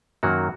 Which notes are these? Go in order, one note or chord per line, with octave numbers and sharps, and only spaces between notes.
F#2 D#3 F#3 A#3 F#4